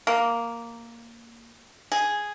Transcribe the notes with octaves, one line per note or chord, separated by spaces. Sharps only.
A#3
G#4